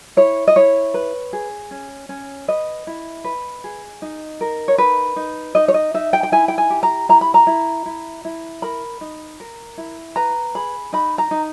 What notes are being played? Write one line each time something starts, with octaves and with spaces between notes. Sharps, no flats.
E4 C#5
D#5
E4 C#5
B4
G#4
C#4
C#4
B4 D#5
E4
B4
G#4
D#4
A#4
C#5
D#4 B4
D#4
D#4 D#5
C#5
D#5
D#4 E5
G5
G5
E4 G#5
G5
G#5
G4
A#5
E4 A#5
B5
A#5
E4
E4
E4
A#4 B5
D#4
A#4
E4
B4 A#5
G#4 B5
D#4 B5
A#5
D#4